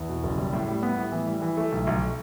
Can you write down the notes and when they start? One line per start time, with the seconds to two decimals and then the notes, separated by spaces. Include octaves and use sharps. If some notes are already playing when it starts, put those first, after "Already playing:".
Already playing: E2
0.09 B2
0.23 F#1
0.38 G3
0.53 A2
0.68 G3
0.83 B3
0.97 A2
1.12 E3
1.27 G3
1.42 E3
1.57 A3
1.72 B1
1.87 B1